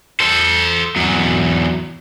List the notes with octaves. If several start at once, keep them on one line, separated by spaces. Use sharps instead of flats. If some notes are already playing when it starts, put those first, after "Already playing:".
A4 C5
E2 F#3